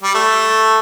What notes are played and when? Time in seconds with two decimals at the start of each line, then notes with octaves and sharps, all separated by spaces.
0.03 G3
0.15 A3